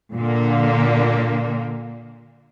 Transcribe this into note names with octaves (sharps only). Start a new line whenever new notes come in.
A#2 D3 A#3